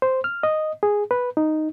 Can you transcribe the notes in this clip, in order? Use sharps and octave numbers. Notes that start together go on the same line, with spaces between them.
C5
F6
D#5
G#4
B4
D#4